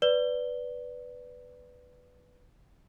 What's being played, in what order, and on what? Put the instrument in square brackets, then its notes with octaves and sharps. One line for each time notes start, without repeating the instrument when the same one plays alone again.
[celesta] B4 D5 G7